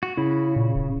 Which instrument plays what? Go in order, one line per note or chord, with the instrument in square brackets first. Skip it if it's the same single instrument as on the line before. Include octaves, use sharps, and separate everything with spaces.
[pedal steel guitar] F#4
[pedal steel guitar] C#3 [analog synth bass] E4
[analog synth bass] A#2
D1